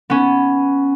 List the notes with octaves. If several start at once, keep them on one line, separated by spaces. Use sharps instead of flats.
B3 C#4